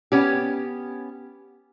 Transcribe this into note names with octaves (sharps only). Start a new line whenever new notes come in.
B3 C#4 G4